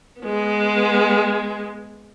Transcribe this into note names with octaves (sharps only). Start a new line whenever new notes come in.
G#3 B3